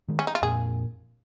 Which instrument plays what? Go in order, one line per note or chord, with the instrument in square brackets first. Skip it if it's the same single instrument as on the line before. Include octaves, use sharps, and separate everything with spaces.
[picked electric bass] D#3 G#3
[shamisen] C#4
D#4
F4
[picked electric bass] F2 A#2 [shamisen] G#4